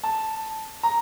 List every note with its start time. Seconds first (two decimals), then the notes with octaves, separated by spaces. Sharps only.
0.04 A5
0.83 A#5